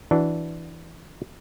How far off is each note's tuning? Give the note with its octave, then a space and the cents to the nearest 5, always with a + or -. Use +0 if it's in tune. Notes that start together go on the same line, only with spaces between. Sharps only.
E3 +0 D4 +0 F#4 +0